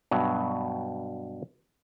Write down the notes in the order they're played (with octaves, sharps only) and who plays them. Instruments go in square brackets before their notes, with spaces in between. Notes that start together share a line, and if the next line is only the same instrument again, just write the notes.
[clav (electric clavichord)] G2 B2 F#3